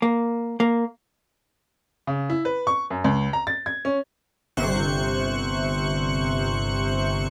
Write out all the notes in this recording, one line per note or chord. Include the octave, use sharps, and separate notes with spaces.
A#3
A#3
C#3
E4
B4
C#6
F#2
C#2
A#5
A6
G#6
C#4
G1 C3 C5 C#6 F#6 C#7